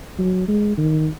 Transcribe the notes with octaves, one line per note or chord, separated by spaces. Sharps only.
F#3
G#3
D#3